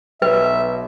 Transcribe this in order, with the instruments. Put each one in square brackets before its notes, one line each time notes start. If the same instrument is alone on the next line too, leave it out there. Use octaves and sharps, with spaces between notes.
[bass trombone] B1 [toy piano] B4 [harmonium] E5